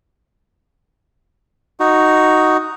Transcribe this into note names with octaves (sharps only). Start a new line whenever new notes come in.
D#4 F#4